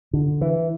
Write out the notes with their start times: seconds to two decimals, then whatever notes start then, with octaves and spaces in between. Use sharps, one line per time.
0.13 D3
0.41 E3